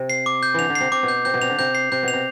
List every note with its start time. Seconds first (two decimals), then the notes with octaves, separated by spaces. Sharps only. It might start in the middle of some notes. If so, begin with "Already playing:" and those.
Already playing: C3
0.10 C7
0.26 D6
0.43 G6
0.54 D3 E3 F7
0.70 D3
0.75 C7
0.81 C3
0.92 C3 D6
1.03 B2
1.08 G6
1.25 C3 G6
1.34 B2
1.42 C3 F7
1.50 D3
1.59 C3 G6
1.75 C7
1.92 C3 G6
2.03 B2 F7
2.13 C3